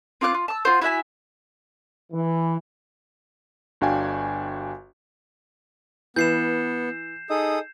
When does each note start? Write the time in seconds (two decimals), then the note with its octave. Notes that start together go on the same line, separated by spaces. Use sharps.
0.21 C4 F4 D6 F#6
0.34 F4
0.48 A5 E6
0.65 F4 F#4 C5
0.82 E4 F#4 E5 G#5
2.13 E3
3.81 G1 D4 F#4 F5 G5 G#5
6.16 E3 B3 G6 C7 E7
7.30 D#4 G#4 A4 D#6